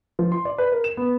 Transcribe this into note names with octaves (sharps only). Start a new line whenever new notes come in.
F3
C6
D5
B4
A#4
E7
B3